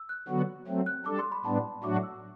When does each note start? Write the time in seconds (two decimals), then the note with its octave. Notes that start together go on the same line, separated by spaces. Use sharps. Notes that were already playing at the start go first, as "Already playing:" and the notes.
Already playing: E6
0.09 F#6
0.28 D3 F#3 B3 F#4
0.67 F#3 A3 C4
0.86 F#6
1.06 G3 D4 A4 D6
1.19 C6
1.32 B5
1.45 A2 G3 B3 D4 A5
1.64 B5
1.84 A2 F#3 A3 D4 F#4 D6
2.03 E6